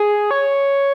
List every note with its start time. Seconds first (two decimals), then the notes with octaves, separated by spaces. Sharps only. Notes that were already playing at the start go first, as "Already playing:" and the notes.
Already playing: G#4
0.31 C#5